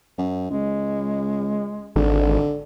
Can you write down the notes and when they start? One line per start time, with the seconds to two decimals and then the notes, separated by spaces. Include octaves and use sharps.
0.18 F#2
0.50 C#2 G#3
1.96 G#1 D3